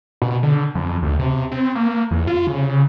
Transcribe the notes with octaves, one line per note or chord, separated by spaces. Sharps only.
B2
D3
F2
D2
C3
C4
A#3
E2
F4
C#3